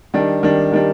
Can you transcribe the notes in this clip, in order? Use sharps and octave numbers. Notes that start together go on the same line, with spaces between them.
D#3 G3 D4
D#3 G3 D4
D#3 G3 D4